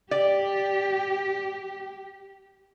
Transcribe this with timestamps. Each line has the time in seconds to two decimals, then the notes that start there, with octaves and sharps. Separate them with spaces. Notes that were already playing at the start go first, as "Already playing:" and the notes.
0.11 G4 D5